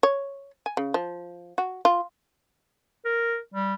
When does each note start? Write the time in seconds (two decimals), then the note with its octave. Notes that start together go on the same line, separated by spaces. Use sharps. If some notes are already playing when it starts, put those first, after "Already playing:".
0.03 C#5
0.66 G#5
0.77 C#3
0.94 F3
1.58 F#4
1.85 F4
3.05 A#4
3.54 G3